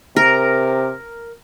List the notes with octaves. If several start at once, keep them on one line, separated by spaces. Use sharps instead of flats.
C3 A#4